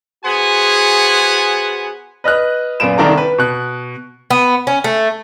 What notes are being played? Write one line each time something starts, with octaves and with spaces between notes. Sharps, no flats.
B3 F#4 G#4 C5 F#5 G#5
B4 D#5 F6 F#6
F#2 A#2 B3 D7 E7
C2 D#3 D4 A4 A#5
B4
B2 F#6
B3
C#4
A3